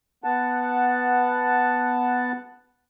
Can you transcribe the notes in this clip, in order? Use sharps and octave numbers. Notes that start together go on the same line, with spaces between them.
B3 F#5 A5